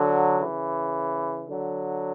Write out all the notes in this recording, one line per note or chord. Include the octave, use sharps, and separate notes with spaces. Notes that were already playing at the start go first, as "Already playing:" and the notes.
Already playing: D3 F#3
C#3 E3
D3 F#3